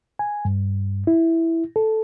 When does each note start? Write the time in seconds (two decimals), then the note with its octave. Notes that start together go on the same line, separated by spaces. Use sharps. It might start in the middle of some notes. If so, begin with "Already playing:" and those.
0.19 G#5
0.45 G2
1.07 E4
1.76 A4